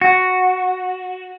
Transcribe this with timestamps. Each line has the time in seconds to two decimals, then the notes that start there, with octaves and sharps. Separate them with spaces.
0.01 F#4